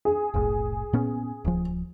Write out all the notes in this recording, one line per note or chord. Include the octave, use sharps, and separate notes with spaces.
G#4
F1 B1 A2
A#2 B3 C#4
D1 F3